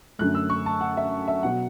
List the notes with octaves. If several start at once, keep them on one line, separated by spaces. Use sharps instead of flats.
F#2 D3 A3 F#6
E6
C#6
A5
F#5
E5
E5
B2 F#3 F#5